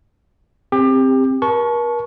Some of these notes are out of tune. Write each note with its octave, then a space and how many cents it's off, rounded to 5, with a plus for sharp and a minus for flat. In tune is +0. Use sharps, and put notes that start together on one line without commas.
C4 +5 G4 +25
A#4 +40 A5 -25 C#6 +0